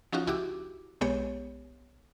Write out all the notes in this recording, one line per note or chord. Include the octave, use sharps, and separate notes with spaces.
F3 C#4 D#4 F4 F#4
C#2 E4 F#4 G4 D6
B1 G#3 B3 G4 C#5